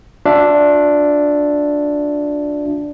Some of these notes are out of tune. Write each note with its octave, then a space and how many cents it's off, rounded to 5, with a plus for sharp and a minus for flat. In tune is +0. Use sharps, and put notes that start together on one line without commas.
D4 +0 F4 +45 E5 +15